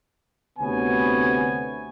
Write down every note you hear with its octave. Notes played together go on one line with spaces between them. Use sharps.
D2 C3 B3 C#5 G#5